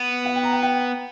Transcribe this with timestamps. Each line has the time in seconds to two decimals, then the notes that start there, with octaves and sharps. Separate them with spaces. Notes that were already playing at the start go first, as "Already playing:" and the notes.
Already playing: B3
0.25 F#5
0.36 G5
0.43 A#5
0.53 G5
0.63 G5